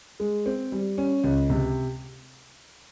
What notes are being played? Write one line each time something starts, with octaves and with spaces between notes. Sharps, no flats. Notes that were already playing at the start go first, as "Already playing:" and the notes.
G#3
C4
G3
C#4
C#2
C3